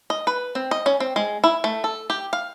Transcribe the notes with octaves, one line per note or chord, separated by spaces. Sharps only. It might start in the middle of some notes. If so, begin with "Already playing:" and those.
D#5
B4
C4
D#5
C#4
C4
G#3
E4
A3
A4
G4
F5